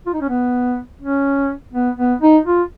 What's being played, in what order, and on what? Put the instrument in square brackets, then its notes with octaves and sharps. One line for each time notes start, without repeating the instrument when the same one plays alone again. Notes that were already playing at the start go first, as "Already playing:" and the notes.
[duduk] F4
D#4
C#4
B3
C#4
B3
B3
D#4
F4